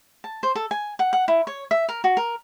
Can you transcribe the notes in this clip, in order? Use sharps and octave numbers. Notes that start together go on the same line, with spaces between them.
A5
C5
A4
G#5
F#5
F#5
E4
C#5
E5
A#4
F#4
A#4